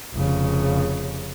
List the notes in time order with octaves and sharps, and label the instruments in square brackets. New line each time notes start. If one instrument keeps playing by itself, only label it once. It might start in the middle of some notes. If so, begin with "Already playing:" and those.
[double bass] F1 C#3